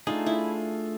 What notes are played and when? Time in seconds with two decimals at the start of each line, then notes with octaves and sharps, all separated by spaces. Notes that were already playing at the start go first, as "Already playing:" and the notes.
0.07 A3 D4 D#4 F4 G#4
0.26 E4